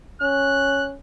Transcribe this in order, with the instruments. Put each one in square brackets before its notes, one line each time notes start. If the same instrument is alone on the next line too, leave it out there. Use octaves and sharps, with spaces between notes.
[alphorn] C#4 [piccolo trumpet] F#6